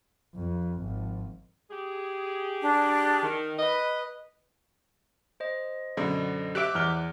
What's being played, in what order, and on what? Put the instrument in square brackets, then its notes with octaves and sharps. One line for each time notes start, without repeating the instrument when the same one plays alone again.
[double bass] F2
G#1 F3
[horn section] G4 G#4
[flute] D4
[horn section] D#3
[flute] B4 [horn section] D#5
[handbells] C5 D#5
[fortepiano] F#2 B2 [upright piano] D3
[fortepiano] G4 E5 [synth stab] D6 E6 F#6
[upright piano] E2 F6 G7